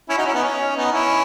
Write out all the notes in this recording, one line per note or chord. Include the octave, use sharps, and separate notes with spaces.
C#4 E4
D#4 F#4
C#4 E4
B3 D#4
C#4
B3 D#4
C#4 E4